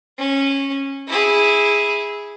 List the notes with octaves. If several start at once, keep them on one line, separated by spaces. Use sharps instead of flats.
C#4
E4 G#4